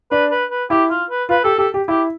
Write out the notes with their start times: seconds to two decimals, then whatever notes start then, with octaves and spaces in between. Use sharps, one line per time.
0.11 D4 B4
0.31 B4
0.50 B4
0.70 E4 G4
0.90 F4
1.10 B4
1.29 F4 B4
1.44 G4 A4
1.58 G4 A4
1.74 G4
1.88 E4 G4